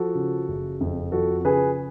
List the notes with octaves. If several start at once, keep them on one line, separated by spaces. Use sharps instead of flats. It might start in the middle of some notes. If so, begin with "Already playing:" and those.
Already playing: F3 F#4 A4
C#3
F#1
F2
F3 F#4 A4
C#3 G#4 B4